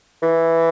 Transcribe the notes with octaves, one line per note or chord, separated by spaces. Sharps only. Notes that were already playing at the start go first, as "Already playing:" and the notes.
E3